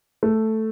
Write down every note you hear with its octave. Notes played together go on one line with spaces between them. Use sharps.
A3